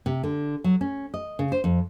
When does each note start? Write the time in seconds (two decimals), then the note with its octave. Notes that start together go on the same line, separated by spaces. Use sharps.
0.06 C3
0.23 D3
0.64 F#3
0.81 C#4
1.14 D#5
1.39 C#3
1.52 C5
1.64 F2